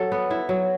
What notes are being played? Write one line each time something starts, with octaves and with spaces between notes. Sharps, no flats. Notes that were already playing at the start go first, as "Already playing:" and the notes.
Already playing: F#3 A4
B3
E4
F#3